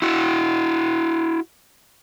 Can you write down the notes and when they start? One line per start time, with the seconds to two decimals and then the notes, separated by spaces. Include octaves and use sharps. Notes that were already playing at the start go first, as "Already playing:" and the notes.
0.02 E4 F#4